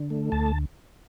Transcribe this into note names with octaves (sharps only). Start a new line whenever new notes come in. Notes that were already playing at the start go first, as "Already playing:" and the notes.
Already playing: D3
A3
D2 A5